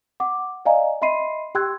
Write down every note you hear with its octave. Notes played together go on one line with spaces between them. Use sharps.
F#5 D6
D5 D#5 F5 G#5 A#5
D#5 E5 B5 C6 C7 D#7
G4 G5 C6 E6 F#6 G#6